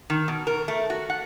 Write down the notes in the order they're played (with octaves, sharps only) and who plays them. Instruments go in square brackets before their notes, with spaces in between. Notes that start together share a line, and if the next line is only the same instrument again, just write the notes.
[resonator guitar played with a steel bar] D#3
B2
A#4
A3
F#4
F#5